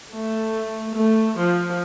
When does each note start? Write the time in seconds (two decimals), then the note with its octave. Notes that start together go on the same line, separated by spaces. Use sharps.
0.13 A3
0.95 A3
1.37 F3